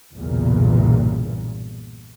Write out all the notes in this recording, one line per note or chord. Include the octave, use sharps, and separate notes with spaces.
B1 E2 G2 A#2 C#3 E3